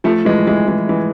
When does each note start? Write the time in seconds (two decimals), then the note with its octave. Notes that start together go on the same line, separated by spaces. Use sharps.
0.04 F3 A3
0.25 E3 G#3
0.47 E3 G#3
0.68 E3 G#3
0.89 E3 G#3